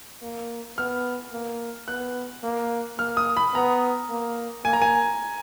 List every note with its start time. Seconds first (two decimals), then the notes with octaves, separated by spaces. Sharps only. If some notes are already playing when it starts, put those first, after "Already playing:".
0.22 A#3
0.78 B3 F6
1.33 A#3
1.88 B3 F#6
2.43 A#3
2.98 A#3 F6
3.17 D#6
3.37 B5
3.54 B3 A#5
4.10 A#3
4.65 A#3 G#5
4.73 A#5
4.82 G#5